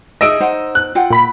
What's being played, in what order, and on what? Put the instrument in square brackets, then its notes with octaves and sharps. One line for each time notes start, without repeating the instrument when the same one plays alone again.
[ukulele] D#4 G#4 E5 [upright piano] D#5 E6 D7
[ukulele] D#4 C5 F#5
[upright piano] F#6
[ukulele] F4 F#5 G5
[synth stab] A#2 B5 B6